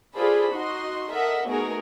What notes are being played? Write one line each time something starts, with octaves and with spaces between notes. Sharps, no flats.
F4 G#4 A4 C5 D5 B5
D#4 F#4 D#5 C6
A4 A#4 D#5 E5 F#5
A3 B3 D#4 F#4 G#4 A#4